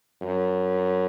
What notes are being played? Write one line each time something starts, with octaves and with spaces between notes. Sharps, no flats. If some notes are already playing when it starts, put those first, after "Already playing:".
F#2